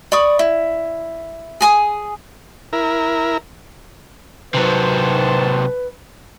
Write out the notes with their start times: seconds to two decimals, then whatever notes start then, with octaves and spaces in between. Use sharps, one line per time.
0.12 D5 B5 C#6 D#6
0.39 E4
1.61 G#4 G#5 D#6
2.73 E4 A#4
4.54 C3 D#3 F#3 B4 C5 A5